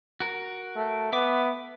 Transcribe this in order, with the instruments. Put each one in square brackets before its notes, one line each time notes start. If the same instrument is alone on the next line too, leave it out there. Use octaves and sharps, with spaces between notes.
[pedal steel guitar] F#4 A#4
[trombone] A3
[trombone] B3 [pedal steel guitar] E5 D6